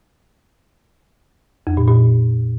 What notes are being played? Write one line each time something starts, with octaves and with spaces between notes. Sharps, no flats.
F2
A#2
A#2